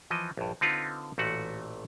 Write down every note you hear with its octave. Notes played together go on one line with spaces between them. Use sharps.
E3 F3 D#5
A#1 G2
D3 C4 D#4 F4 B4
A1 A#2 A3 F#4 F#5